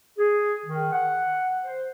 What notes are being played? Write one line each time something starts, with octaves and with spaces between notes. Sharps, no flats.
G#4
D#3
F#5
C5